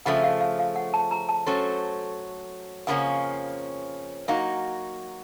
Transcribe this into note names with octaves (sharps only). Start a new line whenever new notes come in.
C#3 F3 A3 F#5
F5
F5
F5
F#5
A5
A#5
A5
F#3 A3 C#4 A4 C5
F2 C#3 F3 A#3 C#4 F#5
F#3 A#3 D#4 F#4 F5